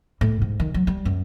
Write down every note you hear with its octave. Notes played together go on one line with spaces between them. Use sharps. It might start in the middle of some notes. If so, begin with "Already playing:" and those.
A2
G#2
D#3
F#3
G3
F#2